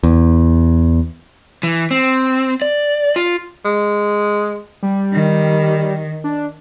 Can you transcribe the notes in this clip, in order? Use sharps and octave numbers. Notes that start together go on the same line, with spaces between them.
E2
E3
C4
D5
F4
G#3
G3
D#3
D4